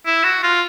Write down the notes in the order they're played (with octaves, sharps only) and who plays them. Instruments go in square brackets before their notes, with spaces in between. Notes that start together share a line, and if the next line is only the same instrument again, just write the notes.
[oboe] E4
F#4
F4